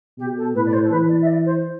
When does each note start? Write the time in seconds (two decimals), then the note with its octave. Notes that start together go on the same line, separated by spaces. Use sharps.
0.18 B2 G4
0.37 A4
0.54 A2 B4
0.66 D5
0.73 C5
0.84 A4
0.91 E3 B4
1.09 D5
1.22 E5
1.26 D5
1.45 C5